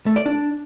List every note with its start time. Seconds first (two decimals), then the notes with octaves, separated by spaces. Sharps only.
0.06 A3
0.16 D5
0.26 D4